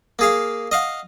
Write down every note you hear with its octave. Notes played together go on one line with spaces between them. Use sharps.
A#3 G#4 F5
D#5 F5 F#5